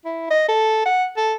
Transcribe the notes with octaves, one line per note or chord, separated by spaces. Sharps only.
E4
D#5
A4
F#5
A4